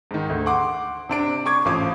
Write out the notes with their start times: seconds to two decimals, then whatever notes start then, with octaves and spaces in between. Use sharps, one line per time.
0.11 G#2 D#3
0.30 D2
0.46 F#5 C6 D6
1.09 C3 D4 D7
1.46 C#6 D6 G#6
1.65 A1 F3 F5 D6 D#6